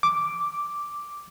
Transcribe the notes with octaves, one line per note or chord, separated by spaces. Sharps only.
D6